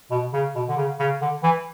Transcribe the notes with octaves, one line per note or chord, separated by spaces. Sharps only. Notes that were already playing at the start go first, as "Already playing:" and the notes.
B2
C#3
B2
D3
C#3
C#3
D3
E3